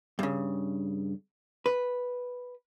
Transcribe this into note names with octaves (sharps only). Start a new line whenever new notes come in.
G2 C#3
B4